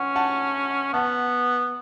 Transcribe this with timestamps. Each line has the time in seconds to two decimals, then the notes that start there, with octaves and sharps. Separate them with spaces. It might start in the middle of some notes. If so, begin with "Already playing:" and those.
Already playing: C#4 F#5
0.16 F#5 A5
0.93 B3 F#5 A5